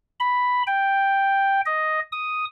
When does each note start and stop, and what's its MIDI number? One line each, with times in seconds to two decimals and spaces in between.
0.20 0.63 83
0.67 1.61 79
1.66 2.00 75
2.12 2.45 87